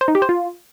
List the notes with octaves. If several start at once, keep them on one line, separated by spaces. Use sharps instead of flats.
C5
D#4
G4
C5
F4